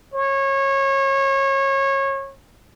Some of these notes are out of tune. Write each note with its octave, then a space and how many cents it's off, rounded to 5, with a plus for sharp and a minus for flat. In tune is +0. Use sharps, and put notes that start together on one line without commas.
C#5 -25